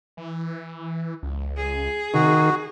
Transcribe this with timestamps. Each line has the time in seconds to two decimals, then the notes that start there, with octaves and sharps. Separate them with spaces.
0.17 E3
1.23 C#2
1.57 G#4
2.14 C3 D#3 F#4